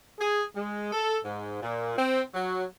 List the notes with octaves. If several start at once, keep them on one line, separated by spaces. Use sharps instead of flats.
G#4
G#3
A4
G#2
A#2
C4
F#3